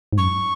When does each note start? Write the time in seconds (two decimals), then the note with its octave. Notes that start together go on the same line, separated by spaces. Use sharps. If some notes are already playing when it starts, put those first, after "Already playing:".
0.13 G#2
0.18 F#2 C#6